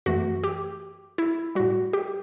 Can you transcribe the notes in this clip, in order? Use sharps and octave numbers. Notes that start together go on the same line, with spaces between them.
F#2 E3 A3 F#4
G4
E4
A2 G3 F#4
G4